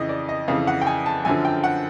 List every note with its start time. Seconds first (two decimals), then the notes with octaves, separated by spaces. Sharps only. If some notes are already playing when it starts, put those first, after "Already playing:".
Already playing: F2 C#3 E3 D#5
0.09 D5
0.29 D#5
0.48 F2 C#3 E3 F5
0.67 F#5
0.81 G5
0.87 G#5
1.06 A5
1.25 F#2 D3 F3 G#5
1.45 G5
1.64 F#5